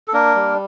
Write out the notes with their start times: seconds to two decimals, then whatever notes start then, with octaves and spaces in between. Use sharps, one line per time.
0.08 A4
0.13 A#3 D4 A#4
0.35 G3